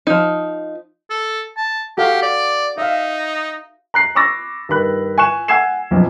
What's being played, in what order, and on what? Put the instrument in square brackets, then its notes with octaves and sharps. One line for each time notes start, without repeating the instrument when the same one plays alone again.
[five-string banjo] F3 D#4
[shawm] A4
A5
[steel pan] F#4 A4 F5 [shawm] G4
[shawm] D5
[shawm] D#4 [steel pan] E5 F5
[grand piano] A#5 F#6 C7
B5 C#6 D6 E6 A6 A#6
G2 D#3 B5 F#6
G#5 C#6 F#6 E7
F#5 G#5 E6 G#6 C7 E7
F#1 B1 F2